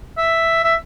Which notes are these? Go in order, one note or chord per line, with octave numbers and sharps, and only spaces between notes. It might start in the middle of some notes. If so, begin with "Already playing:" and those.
E5
E5